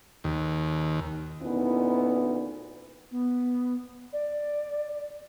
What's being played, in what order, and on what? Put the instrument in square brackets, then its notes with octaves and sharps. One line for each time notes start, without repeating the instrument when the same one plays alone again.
[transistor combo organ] D#2
[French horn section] D2 A#2 B3 C#4 D#4 E4
[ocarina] B3
D5